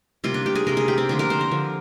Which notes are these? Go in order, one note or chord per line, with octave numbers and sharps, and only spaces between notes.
C3 G3 A#3 F4
D4
G4
G#4
C3 G3 A#3 A#4
G#4
G4
C4
D3 F3 A#3 D4
A#4
C5
A#4
D3 F3 A#3